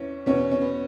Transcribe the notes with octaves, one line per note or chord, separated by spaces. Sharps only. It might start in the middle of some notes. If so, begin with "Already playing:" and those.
Already playing: E2 E3 C#4
E2 B2 C#4
C#4
B3